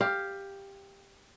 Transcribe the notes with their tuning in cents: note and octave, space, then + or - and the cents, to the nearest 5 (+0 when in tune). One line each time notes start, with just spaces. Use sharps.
G4 +10 F5 +0